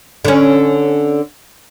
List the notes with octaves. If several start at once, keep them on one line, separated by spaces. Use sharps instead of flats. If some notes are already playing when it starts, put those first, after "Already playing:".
D3 C#4